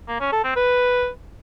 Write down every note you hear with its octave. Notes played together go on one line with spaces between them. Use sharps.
A#3
C#4
A4
C4
B4